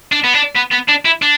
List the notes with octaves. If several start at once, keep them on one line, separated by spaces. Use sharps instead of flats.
D4
B3
D4
B3
B3
D4
E4
D4